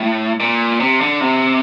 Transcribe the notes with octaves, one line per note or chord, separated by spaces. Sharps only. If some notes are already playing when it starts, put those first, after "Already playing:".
Already playing: A2
A#2
C3
D3
C3